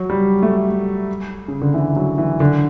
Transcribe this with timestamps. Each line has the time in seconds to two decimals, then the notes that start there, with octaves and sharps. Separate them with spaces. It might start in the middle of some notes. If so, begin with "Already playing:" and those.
Already playing: F#3
0.10 G3
0.42 A3
1.48 C#3
1.61 D3
1.74 E3
1.96 F#3
2.18 E3
2.40 D3